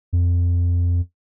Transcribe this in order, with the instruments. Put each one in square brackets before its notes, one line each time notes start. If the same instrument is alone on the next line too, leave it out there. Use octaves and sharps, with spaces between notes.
[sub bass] F2